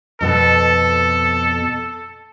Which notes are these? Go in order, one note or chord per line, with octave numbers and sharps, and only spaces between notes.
F2 B2 B3 A4